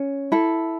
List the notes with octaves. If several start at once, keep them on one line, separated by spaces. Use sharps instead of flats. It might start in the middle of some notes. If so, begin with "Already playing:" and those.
Already playing: C#4
E4 A4